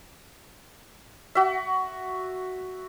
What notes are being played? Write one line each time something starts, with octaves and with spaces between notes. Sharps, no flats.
F#4 E5